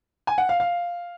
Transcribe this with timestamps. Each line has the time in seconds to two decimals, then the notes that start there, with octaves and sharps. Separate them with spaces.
0.27 G#5
0.38 F#5
0.49 F5
0.60 F5